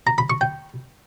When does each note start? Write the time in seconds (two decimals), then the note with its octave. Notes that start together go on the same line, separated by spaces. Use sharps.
0.07 A#5
0.18 B5
0.30 C#6
0.41 G5